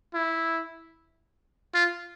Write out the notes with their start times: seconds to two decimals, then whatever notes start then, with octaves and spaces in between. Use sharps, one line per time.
0.14 E4
1.74 F4